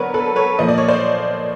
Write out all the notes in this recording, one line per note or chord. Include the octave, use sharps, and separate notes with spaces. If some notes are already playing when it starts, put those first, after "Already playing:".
Already playing: D3 F#3 B3 D4 A#4 B4 C#5
A4 B4
B4 C#5
A#2 F3 A#3 D#5
D5
C#5
C5 D5